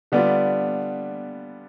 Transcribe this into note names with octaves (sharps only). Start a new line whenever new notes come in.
D3 G3 B3 D4 F4